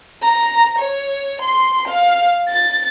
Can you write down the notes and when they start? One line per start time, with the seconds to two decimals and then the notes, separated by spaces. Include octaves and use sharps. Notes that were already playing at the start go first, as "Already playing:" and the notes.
0.23 A#5
0.79 C#5
1.42 C6
1.88 F5
2.49 A6